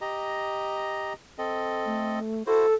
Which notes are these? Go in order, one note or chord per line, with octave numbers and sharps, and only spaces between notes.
G4 D#5 A#5
C4 A4 D#5
A3
E4 F#4 A4 C5